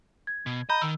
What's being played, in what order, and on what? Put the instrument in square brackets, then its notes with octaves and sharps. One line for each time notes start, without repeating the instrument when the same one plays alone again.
[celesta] G#6
[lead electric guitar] B2
[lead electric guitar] D#5 [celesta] A#5 B5 G6
[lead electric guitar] D#3 [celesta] E6